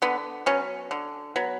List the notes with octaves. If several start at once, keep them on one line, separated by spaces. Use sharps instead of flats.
D3 B3
F#3 B3 C#4
D3
F#3 B3